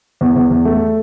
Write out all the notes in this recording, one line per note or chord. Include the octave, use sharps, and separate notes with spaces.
E2
E2
E2
A3